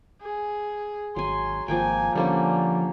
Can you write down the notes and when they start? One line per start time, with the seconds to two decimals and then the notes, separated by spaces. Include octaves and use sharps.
0.22 G#4
1.16 G#1 F#3 G#5 C6
1.68 G#1 F3 A#3 G5 G#5
2.15 D3 F3 G3 A#3 C#4